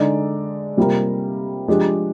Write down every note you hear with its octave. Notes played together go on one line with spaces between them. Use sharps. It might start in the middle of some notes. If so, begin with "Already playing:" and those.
Already playing: D3 G#3 D#4 G#4 D5
C3 G3 A#3 F4 A#4
F3 G#3 D4 G4